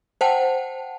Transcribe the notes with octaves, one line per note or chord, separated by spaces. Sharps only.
C5 F#5 G5 A5